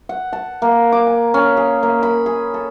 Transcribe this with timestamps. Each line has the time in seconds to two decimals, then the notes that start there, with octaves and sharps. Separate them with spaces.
0.09 F#5
0.33 A5
0.62 A#3
0.92 D6
1.07 G#5
1.34 C#4
1.57 G#4
1.83 A#3
2.03 B5
2.26 G#4
2.54 A4